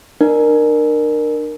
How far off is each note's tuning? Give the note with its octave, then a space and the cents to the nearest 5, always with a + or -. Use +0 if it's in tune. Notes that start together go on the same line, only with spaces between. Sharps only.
D4 +40 A#4 +0